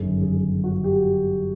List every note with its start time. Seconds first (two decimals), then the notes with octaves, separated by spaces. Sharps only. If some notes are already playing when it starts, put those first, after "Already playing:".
Already playing: G1 F#2 D#3 G#4
0.21 G#4
0.64 F#4
0.84 G4